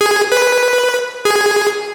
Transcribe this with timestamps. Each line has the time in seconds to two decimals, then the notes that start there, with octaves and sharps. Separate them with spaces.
0.01 G#4
0.32 B4
1.25 G#4